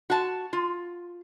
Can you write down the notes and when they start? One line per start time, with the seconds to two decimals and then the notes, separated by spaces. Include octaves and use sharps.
0.10 F#4 A5
0.53 F4